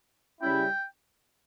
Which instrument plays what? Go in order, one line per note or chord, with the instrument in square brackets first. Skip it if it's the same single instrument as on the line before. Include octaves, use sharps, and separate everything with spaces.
[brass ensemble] C#3 G3 C#4 E4 [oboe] G5